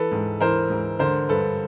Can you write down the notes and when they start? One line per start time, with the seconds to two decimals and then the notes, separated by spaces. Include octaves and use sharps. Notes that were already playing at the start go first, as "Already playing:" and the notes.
Already playing: E3 A4 B4
0.12 G#2
0.41 E3 A#4 C5
0.70 G#2
0.99 D3 A#4 C5
1.29 G2 A4 B4